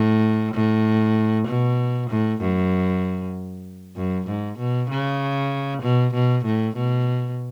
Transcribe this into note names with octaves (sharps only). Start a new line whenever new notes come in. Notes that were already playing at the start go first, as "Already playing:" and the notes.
Already playing: A2
A2
B2
A2
F#2
F#2
G#2
B2
C#3
B2
B2
A2
B2